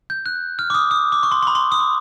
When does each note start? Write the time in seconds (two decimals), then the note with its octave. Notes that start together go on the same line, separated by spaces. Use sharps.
0.10 G6
0.26 F#6
0.59 F6
0.70 D6
0.74 D#6
0.91 D#6
1.12 D6
1.23 C#6
1.32 C6
1.42 C6
1.47 B5
1.55 C6
1.72 D#6
1.80 D6